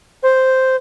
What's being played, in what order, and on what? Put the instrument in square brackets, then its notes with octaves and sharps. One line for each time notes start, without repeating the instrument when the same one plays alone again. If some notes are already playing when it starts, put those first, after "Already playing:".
[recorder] C5